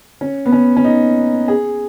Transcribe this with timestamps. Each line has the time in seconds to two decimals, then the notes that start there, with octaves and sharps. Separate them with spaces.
0.21 C#4
0.46 B3
0.52 C#4
0.77 C#4
0.84 D#4
1.48 G#4